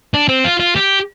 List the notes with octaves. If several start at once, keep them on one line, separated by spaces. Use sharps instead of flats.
D4
C4
F4
F4
G4